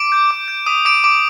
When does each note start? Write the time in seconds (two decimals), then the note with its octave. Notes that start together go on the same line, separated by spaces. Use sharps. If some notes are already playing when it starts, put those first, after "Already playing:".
Already playing: D6 D7
0.12 G6
0.31 D6
0.48 G6
0.66 D6 D#6 D#7
0.85 D6 G6 D7
1.04 D6 D7